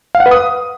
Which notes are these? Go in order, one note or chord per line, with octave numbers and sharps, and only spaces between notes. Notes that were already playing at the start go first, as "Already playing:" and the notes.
F5
F#5
B4
D#6